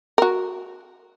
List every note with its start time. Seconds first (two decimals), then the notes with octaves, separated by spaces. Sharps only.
0.18 F#4 A#4